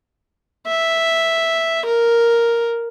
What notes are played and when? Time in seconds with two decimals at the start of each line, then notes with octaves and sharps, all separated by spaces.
0.68 E5
1.86 A#4